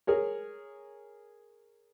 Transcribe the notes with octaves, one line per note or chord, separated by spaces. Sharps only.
G#4 A#4 C#5